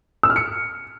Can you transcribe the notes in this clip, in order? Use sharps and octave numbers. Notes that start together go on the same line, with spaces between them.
E6
F6
C#7